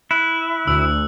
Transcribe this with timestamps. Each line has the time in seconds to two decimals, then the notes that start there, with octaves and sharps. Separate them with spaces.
0.11 E4 F#6
0.68 D2 E6